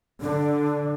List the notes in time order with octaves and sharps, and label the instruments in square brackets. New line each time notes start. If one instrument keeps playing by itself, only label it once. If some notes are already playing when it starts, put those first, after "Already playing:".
[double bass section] D3 [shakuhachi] D4